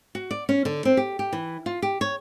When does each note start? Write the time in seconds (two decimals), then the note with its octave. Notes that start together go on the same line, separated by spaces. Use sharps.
0.15 F#4
0.31 D5
0.49 C#4
0.65 D3
0.85 C4
0.97 G4
1.19 G4
1.33 E3
1.66 F4
1.82 G4
2.01 C#5